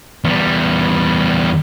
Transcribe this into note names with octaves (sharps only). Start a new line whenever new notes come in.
E2 G3